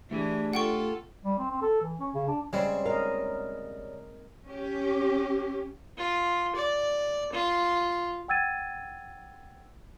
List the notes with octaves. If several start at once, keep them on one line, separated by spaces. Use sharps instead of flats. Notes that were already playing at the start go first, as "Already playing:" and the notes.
E3 A3 D4 G4 G#4
F4 A4 F#5 G5 C#6
G3
C4
C4
A4
E3
C#4
C#3
D4
C#3 G3 G#3 C4
A#4 D#5 F5
C#4 G4
F4
D5
F4
F#5 G5 E6 G#6 A6 D#7